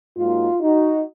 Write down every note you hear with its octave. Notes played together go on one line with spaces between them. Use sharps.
G#2 F#3 A#3 D#4 F4
D#4 F#4